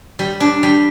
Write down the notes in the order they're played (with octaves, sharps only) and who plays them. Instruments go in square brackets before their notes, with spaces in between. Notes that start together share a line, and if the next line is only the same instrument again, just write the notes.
[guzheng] G3
D4
G3